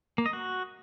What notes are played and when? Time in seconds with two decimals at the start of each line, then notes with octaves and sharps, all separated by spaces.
0.18 A#3
0.26 D#5
0.33 F#4